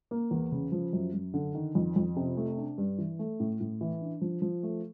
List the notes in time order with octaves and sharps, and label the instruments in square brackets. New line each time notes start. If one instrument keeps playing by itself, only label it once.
[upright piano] A#3
E2
C#3
F3
F#2
F#2
D3
D#3
F2
F2
C3
A3
D4
G2
E3
A3
A2
A2
E3
D4
F3
F3
A3